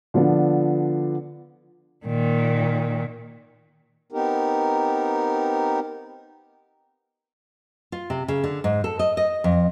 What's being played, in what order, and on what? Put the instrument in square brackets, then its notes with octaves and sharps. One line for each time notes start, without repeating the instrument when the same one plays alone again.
[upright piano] D3 F3 B3 D5
[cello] A#2 D#3
[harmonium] B3 C4 D#4 G4 A#4
[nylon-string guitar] F4
C3
C#3
D3
G#2
A4
D#5
D#5
F2